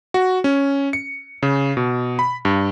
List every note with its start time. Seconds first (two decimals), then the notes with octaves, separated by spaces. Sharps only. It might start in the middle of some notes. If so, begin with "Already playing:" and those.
0.14 F#4
0.44 C#4
0.93 C#7
1.43 C#3
1.77 B2
2.19 B5
2.45 G2